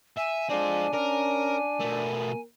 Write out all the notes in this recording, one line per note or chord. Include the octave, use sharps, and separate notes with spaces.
E5 G#5
G#3 C4 D4 F4
C#4 D4 A#4
B2 A3 A#4